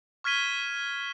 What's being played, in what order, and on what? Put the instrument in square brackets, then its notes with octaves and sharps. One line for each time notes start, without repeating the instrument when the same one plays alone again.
[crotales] C#6 F6 G#6 B6 D#7 G7